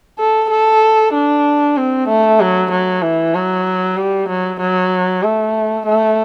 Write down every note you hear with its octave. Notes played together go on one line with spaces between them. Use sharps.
A4
A4
D4
C4
A3
F#3
F#3
E3
F#3
G3
F#3
F#3
A3
A3